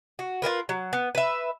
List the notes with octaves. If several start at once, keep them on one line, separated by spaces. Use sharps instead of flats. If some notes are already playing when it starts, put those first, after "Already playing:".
F#4
F4 F#4 A#4 B4
F#3
B3
B4 E5